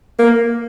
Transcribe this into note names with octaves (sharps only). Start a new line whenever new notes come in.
A#3